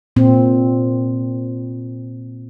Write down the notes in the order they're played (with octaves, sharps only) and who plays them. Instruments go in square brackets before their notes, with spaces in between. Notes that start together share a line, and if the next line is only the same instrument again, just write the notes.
[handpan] A#2 C4